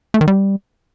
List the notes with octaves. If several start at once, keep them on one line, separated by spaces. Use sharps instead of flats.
A3
D#3
G3